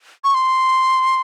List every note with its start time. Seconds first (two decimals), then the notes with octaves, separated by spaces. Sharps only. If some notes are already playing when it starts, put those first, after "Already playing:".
0.24 C#6
0.34 C6